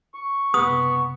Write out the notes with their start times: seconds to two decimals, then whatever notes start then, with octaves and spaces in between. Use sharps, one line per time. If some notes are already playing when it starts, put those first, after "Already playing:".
0.14 C#6
0.54 F#1 C3 B3 D#6